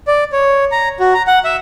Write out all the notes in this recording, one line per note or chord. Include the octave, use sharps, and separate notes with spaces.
D5
C#5
A#5
F#4
A#5
F#5
E5